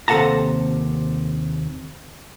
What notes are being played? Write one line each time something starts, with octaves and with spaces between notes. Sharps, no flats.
D#2 C3 A4 F#5 A5 A#5